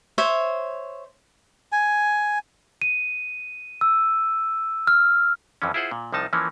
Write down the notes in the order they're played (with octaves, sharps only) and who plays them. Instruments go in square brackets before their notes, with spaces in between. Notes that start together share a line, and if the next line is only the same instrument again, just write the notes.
[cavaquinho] C5 C#5 E5
[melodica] G#5
[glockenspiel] D#7
E6
F6
[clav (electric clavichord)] F2 E3 F3 C#4
E4 F4 G#4 C5 F#5
A#2
C2 C3 F3 D#4 A5
E3 F3 A#3 C#4